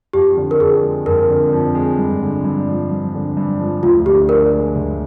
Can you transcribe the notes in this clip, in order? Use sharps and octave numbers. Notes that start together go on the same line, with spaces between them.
F2 G4
D3
A#4
F2 G#4
G#3
F2 A#4
D3
F2
G#3
G2
D3
G2
F3
G2
D3
G2
F3
D2 F4
D3 G4
D4 A#4
G#3
D2